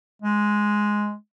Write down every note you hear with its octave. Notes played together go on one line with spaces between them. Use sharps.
G#3